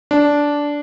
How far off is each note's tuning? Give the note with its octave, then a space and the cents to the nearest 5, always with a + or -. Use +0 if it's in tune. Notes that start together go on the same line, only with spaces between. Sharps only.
D4 -10